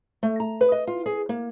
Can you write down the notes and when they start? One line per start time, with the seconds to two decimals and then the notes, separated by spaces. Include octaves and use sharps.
0.23 A3
0.40 A#5
0.61 B4
0.72 D#5
0.87 F4
1.06 G#4
1.29 A#3